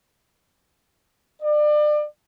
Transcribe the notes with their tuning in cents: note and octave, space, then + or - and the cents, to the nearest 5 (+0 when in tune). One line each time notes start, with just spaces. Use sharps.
D5 +30